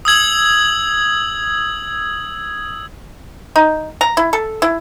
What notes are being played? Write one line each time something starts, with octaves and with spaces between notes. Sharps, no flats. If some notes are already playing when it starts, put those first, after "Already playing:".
D#6 E6 G#6 F#7
D#4
A#5
E4
A4
E4